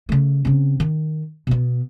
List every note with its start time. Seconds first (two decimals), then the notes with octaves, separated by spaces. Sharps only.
0.09 C#3 A3
0.45 C#3 C4
0.80 D#3
1.47 B2 B3